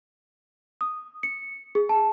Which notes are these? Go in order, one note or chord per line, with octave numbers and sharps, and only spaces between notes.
D#6
C#7
G#4
A5